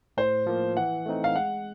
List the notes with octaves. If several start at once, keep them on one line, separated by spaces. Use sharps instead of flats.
A2 C5
F3 A#3
E3 F#5
A3 C4 D#4
F5
G#3 F#5